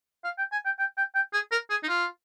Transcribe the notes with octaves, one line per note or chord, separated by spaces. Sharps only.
F5
G5
G#5
G5
G5
G5
G5
G#4
A#4
G#4
D#4
F4